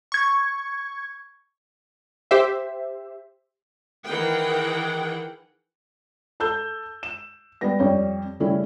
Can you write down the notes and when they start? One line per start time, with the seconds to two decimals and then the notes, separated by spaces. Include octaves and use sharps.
0.12 C#6 G#6
2.31 G4 C5 E5
4.07 D#3 E3 G#4 F#5 G5
6.40 A4 A5 E6 G6
7.03 E7
7.61 G3 B3 B4 A#6
7.80 F2 G3 C#5
8.40 C#3 G3 A3 C#4 E4